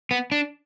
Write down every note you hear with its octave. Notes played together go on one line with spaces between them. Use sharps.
B3
D4